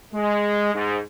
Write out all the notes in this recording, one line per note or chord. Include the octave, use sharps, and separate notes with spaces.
G#3
G#2